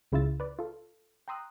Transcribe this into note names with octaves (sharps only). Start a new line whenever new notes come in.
C#2 C#3 E4 F4 E6 A6
B4 D5
F4 A4
G5 A#5 C6 D#6 E6 F#6